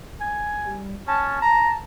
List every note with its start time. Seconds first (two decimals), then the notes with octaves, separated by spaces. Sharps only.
0.20 G#5
0.66 G3
1.07 C#4 A5
1.42 A#5